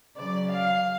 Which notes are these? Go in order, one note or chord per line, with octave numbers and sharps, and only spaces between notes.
C#3 F#3 D5
F5